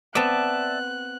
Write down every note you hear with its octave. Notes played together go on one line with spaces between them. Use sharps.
B3 C4 D5 E5 A5 F#6